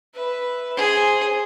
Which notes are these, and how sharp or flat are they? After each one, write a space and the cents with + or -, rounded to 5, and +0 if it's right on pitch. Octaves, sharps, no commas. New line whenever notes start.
B4 +0 E5 +0
G#4 +0 C5 +0